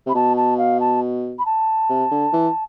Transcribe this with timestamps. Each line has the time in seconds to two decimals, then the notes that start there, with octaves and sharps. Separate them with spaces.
0.06 C3 B5
0.14 B2 A5
0.36 A5
0.58 F5
0.80 A5
1.38 B5
1.45 A5
1.89 C3
2.11 D3
2.33 E3